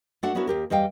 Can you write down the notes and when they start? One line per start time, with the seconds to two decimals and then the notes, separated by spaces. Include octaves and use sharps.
0.23 A3 D4 F#4 D5 F#5
0.35 B3 C#4 D4 E4 F#4 A#4
0.47 D#2 G4 A#4
0.70 E2 G3 D#5 F5 G5